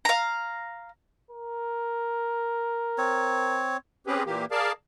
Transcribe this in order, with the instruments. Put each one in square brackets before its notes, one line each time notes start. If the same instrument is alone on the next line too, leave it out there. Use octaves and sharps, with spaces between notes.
[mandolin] F5 A#5
[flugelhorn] A#4
[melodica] C4 C#5
[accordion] C4 C#4 G4 G#4 B4
A#2 E3 A#3 G4
G#4 A#4 D5 F5 A5